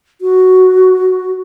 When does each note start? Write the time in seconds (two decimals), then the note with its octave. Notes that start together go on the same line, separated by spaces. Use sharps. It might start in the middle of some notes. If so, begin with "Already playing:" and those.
0.21 F#4